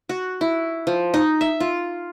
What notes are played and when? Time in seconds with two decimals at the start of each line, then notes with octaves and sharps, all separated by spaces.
0.09 F#4
0.41 E4
0.87 F3
1.14 D#4
1.41 E5
1.60 F4